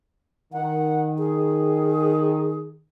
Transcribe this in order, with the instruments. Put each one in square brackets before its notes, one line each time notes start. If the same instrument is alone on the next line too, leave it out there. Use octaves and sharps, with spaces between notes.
[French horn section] D#3 [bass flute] F#5
[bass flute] G#4